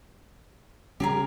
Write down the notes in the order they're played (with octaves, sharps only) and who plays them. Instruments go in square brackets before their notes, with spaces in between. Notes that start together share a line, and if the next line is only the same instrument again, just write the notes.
[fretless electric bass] C#3 G3 C#4 [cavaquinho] G4 G#4 A#4